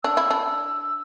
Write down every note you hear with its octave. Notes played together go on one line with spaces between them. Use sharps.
D4 E6
E4
D4